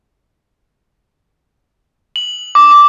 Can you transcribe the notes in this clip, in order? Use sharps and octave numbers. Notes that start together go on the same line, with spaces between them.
F#7
D6
D6